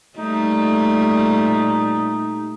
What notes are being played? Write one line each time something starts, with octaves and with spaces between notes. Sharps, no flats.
A#2 G3 A3 D#4